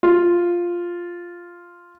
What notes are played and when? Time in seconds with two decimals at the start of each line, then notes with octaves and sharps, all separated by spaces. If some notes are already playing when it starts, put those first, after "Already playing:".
0.03 F4